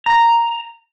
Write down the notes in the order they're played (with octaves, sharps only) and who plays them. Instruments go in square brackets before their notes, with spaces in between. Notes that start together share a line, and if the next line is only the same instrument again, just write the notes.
[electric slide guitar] A#5